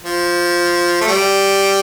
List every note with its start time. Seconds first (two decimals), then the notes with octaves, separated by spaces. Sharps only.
0.04 F3
1.01 A3
1.08 G3